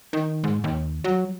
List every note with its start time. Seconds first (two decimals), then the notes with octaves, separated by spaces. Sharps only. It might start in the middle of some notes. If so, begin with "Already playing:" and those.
0.13 D#3
0.44 G#2
0.64 D#2
1.04 F#3